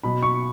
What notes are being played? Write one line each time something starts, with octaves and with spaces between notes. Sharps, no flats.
B2 F#3 B5
C#6